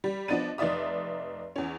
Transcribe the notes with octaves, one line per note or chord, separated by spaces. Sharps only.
G3
F3 B3 D4 D#5 A6 D#7
F1 D#4 D5 E5 D#6
E2 C#4